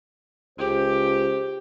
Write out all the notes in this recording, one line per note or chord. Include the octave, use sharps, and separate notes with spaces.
C#2 G4 C5